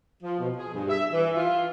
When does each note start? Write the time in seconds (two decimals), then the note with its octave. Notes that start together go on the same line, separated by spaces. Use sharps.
0.23 F3
0.39 B2
0.56 G#4
0.73 G2
0.89 E5
1.12 E3
1.36 F4